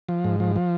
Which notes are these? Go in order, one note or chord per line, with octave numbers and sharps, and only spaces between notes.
F3
G#2
F3
F3